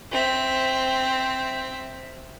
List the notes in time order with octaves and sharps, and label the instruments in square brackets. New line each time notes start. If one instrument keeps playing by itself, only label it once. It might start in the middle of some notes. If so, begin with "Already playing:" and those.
[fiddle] C4 E5